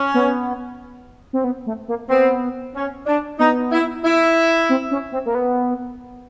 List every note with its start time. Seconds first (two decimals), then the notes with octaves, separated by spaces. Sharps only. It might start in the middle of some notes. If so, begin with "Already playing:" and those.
Already playing: C#4
0.14 B3
1.33 C4
1.44 B3
1.66 A3
1.88 A#3
2.09 B3 C4
2.75 C#4
3.06 D4
3.39 B3 D#4
3.72 E4
4.04 E4
4.69 C4
4.91 C#4
5.12 C4
5.26 A#3
5.35 B3